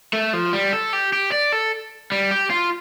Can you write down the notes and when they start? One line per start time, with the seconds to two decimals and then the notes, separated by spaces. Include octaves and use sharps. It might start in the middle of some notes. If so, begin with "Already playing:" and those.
0.13 A3
0.33 F3
0.53 G3
0.73 A4
0.93 G4
1.13 G4
1.32 D5
1.52 A4
2.12 G3
2.31 G4
2.50 F4